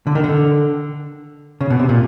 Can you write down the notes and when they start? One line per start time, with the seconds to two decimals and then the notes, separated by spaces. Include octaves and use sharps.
0.07 D3
0.15 D#3
0.24 D3
1.61 C#3
1.70 B2
1.79 C3
1.89 A#2